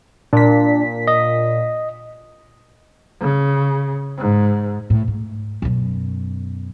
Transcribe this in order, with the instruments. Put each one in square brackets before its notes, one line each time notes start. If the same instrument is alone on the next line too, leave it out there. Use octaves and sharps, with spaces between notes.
[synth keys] A#2 B6 [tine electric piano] D4
[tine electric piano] D#5
[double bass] C#3
G#2
[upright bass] A2
G#2
F#2 B2